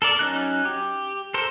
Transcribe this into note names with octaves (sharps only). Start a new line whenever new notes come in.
A4 A#4 D5
F#3 C#4 D#4 F#6
G4
A4 A#4 C5